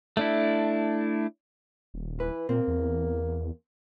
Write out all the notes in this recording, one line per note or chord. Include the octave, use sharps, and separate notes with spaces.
A3 D4 E4
D#1
E3 B4
A#2 A#3 C4
E2